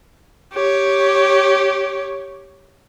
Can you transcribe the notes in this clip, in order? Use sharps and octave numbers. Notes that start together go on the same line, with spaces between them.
G4 C#5